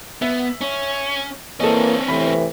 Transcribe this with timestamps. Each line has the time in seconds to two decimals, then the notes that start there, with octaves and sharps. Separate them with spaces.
0.22 B3 E5
0.61 C#4
1.60 E3 A#3 C4 C#4 A4 D#5
2.08 A2 C3 E3 B5